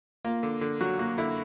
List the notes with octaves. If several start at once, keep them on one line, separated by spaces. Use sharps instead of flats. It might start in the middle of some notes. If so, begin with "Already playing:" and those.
A#3 F4
D3
D3
F#3 F#4
A#3 F#4
D3 E4